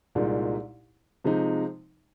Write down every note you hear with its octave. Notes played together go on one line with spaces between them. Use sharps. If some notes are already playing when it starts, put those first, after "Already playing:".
C2 A#2 G#3 D#4
C3 F3 G#3 D#4